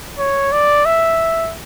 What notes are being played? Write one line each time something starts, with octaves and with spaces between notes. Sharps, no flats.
C#5
D5
E5